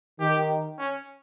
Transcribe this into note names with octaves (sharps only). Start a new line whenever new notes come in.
D#3 G4
C#4